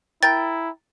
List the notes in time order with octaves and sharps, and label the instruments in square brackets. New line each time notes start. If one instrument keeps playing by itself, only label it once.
[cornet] E4 [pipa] A#4 G5 [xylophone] A6